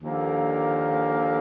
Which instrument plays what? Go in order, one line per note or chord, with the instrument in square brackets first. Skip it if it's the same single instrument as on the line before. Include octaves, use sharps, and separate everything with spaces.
[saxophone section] D#2 D3 F3 A#3